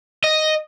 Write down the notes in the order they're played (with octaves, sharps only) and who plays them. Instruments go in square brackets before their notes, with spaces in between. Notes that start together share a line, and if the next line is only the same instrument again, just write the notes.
[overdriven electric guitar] D#5